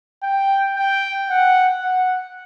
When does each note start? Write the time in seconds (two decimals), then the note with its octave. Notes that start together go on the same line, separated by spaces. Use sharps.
0.23 G5
0.77 G5
1.30 F#5
1.83 F#5